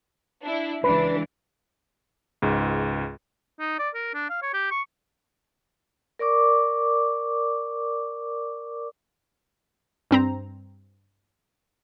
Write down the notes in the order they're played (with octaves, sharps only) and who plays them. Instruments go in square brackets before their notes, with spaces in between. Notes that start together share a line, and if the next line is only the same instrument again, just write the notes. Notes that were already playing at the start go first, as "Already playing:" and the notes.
[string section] D4 E4
[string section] C#2 E3 D4 [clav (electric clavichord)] B4
[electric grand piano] C#2 G#2
[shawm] D#4
D5
A#4
D4
F5
C#5
G4
C#6
[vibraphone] A#4 D5 C#6 D6
[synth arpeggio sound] G2 C4 A#5